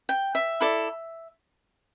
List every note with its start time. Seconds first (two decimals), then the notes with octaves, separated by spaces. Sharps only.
0.09 G5
0.35 E5
0.61 E4 A4 D5